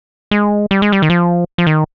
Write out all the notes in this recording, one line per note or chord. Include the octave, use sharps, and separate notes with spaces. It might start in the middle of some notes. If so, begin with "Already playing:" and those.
G#3
G3
G#3
G3
D#3
F3
F3
D#3